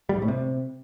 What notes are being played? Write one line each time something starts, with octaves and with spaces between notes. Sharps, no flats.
G3
G#2
A2
C3